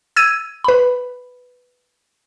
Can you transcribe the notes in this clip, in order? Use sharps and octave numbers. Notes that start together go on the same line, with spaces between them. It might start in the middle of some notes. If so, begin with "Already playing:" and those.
E6 G#6 D#7
B4 B5